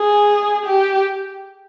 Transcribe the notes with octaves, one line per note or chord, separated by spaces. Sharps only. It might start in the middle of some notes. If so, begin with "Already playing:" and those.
Already playing: G#4
G4